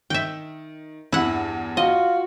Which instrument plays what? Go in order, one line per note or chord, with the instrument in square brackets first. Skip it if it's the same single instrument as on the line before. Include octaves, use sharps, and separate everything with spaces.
[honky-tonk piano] D#3 [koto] E5 G5
[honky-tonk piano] E2 G2 [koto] E4 F#5
[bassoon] F4 [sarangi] F#4 [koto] D#5